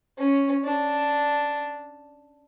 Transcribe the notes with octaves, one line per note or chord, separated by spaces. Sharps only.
C#4
D4